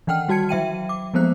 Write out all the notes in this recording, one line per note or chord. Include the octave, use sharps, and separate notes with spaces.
D#3 E3 F#5 G5 F6
G3 F#4 A5 G#6 C#7
F#3 E5 G5 D#7
D6
F3 G#3 A#3 B3 C5 F#6